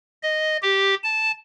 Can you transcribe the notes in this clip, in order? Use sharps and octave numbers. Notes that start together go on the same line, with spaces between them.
D#5
G4
A5